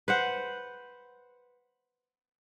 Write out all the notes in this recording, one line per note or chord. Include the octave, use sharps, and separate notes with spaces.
B4 C5 F#5